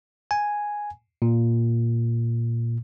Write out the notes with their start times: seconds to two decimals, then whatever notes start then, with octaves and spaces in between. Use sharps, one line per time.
0.31 G#5
1.22 A#2